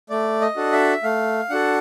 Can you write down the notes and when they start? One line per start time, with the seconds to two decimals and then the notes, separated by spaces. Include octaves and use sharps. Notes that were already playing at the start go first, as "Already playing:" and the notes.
0.10 A3 D5
0.41 D#5
0.57 D4 F#4 A4
0.72 E5
1.03 A3 F5
1.50 D4 F#4 A4 F#5